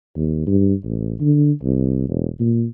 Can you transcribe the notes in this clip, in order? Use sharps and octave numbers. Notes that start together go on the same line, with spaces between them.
D#2
G2
A1
D3
C2
E1
A#2